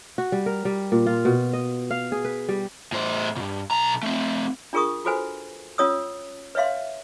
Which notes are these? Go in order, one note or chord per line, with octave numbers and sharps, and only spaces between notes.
F#4
G3
A#4
G3
A#2
F4
B2
D#5
F5
G#4
B4
G3
A2 C5
G2 A#2
B1 A#5
A3 C4
D4 F4 G#4 A#4 C#6 D#6
F4 F#4 A4 B4 C5 G#5
C#4 F4 C#5 D#6 E6
B4 C#5 E5 F5 C6